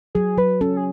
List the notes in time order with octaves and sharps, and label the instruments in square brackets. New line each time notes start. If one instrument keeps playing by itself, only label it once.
[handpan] F#3 [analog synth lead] G#4
[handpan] F#3 [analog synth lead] B4
[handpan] C#4 [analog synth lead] A4
[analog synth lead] G#4